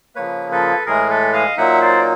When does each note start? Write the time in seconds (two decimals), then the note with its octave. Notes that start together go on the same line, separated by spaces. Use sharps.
0.15 C#3 F3 A#3 B4 C#5
0.51 A4 B4
0.86 A2 E3 G#3 G#4 A#4
1.10 A4 B4
1.33 D#5 F5
1.57 A#2 F#3 A#3 D#4 E5 F#5
1.82 C5 D5